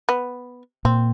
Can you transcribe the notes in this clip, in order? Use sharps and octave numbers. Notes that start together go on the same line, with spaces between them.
B3
A#2 C4